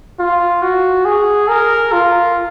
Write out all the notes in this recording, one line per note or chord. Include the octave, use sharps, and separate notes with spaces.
F4
F#4
G#4
A#4
F4